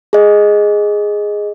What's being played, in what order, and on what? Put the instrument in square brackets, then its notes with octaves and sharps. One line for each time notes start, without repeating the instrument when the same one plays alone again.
[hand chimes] G#4 D#5